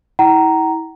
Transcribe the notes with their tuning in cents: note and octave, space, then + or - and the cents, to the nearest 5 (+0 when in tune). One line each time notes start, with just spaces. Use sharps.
E4 -30 F#5 +45 A#5 +0